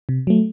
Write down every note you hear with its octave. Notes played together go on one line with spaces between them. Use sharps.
C3
F#3 A3